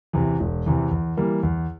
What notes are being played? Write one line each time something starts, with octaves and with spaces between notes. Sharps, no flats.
E2 C3 E3
E1
E2 C3 E3
E2
E3 G3 A#3
E2